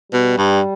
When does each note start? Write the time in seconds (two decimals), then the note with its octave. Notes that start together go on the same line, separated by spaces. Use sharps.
0.12 B2 G3
0.38 G2